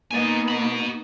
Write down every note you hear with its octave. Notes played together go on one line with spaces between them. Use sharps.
A#3 B3 D#4 D5 G#5
F#4 B5